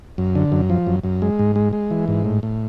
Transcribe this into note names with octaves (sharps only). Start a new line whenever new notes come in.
F#2
D3
F#2
F3
F#2
F#2
G#3
G#2
G#3
G#3
E3
G#2
A2
A2